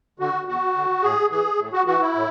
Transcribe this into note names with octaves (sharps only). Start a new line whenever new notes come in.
D3 F#4
E2 F#4
D3
A2 G#4
E3 G#4
A2
F#4
E3 F#4
E4
A2